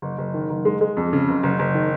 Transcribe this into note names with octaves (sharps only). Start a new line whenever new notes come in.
F#1
F#1
D#3
F#1
G#3
G#3
F2
C#3
F#1
F#1
F#1
D#3